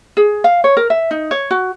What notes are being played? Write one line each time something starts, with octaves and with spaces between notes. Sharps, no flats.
G#4
F5
C#5
A#4
E5
D#4
C#5
F#4